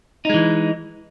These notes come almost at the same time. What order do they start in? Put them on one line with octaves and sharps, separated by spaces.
D#4 G#3 E3